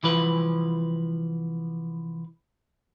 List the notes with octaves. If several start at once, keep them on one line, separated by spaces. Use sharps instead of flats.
C2 E3 F3 B4